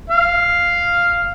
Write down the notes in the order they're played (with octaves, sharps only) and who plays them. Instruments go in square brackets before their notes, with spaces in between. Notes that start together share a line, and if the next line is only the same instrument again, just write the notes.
[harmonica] F5